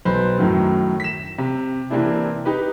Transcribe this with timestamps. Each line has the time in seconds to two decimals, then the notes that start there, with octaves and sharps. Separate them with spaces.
0.05 B1 B4 C5
0.38 F#2 A2 D#3 F#3
1.00 B6 E7
1.38 C3
1.90 C3 E3 A#3 C4 D4 E4
2.45 D#4 G4 B4